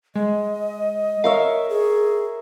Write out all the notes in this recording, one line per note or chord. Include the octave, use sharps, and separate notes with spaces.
G#3 D#5
A#4 C#5 E5 F5
G#4